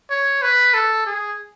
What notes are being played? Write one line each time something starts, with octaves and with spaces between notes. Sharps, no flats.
C#5
B4
A4
G#4